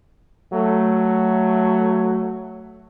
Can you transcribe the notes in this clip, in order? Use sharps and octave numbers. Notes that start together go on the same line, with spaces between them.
F#3 A3